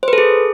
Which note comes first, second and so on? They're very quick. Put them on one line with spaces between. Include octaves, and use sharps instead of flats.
C5 B4 A4 G#4